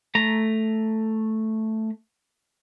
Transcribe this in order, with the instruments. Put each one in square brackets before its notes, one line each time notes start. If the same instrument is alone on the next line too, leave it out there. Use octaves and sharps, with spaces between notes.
[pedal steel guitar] A3 A#5